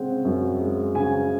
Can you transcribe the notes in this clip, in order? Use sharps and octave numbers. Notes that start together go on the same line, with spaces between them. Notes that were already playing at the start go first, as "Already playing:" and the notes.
Already playing: C#3 G#3 C4 F#5
F#2
G#3
C#3 G#5